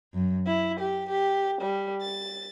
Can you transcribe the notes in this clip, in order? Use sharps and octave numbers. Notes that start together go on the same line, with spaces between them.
F#2
E4
G4
G4
G3
A6